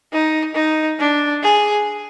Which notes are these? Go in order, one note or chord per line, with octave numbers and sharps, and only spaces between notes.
D#4
D#4
D4
G#4